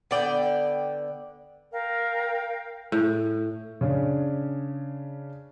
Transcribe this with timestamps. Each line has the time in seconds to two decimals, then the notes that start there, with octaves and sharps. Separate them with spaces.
0.11 D3 B3 D5 G5
1.72 A#4 F5 G5
2.92 A2
3.81 C#3 C#4 D4